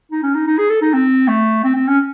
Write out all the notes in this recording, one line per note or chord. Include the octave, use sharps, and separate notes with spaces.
D#4
C#4
D#4
D#4
G#4
A4
D#4
C4
A3
C4
C4
C#4